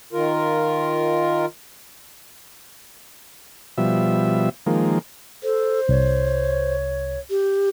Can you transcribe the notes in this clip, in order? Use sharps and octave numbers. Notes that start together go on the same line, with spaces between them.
D#3 F4 A#4
B2 F3 G3 E5
D#3 F3 G#3 A#3
A4 C5
C2 C#5
G4